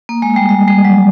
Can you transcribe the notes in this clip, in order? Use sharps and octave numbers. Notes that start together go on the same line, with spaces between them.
A#3
G#3
G3
G3
G3
F#3